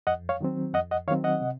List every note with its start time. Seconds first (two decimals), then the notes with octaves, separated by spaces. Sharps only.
0.07 F2 D#5 F#5
0.29 C#5 F5
0.41 D#3 F#3 C4
0.74 F2 D#5 F#5
0.91 D#5 F#5
1.08 D#3 F#3 C4 C#5 F5
1.24 D#5 F#5
1.41 C3